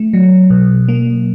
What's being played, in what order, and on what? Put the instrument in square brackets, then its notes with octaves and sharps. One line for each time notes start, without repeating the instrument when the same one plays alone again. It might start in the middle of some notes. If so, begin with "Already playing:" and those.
Already playing: [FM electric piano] A3
F#3
B2
A#3